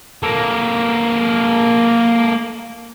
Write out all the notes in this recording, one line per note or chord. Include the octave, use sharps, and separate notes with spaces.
A#3 A4